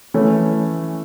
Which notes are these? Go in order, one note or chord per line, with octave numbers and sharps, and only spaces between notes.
E3 A3 C#4